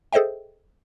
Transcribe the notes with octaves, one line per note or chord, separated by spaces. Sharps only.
G#4 A4 C5 D#5 E5 G5